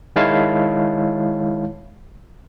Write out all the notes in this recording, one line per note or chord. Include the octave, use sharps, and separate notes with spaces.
D#3 G#3 E4 C#5 F5 A5